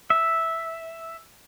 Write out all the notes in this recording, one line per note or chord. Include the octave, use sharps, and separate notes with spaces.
E5